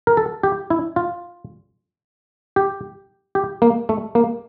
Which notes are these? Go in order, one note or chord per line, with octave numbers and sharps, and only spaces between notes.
A#4
A4
G4
E4
F4
G4
G4
A#3
A3
A#3